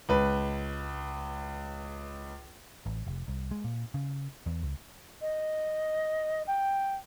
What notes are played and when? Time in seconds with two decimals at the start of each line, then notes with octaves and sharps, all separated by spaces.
0.09 C#2 B4
2.86 A1
3.07 F1
3.28 C2
3.51 G#3
3.64 A#2
3.94 C#3
4.46 E2
4.63 C#2
5.21 D#5
6.47 G5